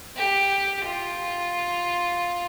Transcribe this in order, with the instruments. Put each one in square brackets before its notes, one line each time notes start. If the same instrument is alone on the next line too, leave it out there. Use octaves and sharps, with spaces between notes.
[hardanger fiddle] G4
F4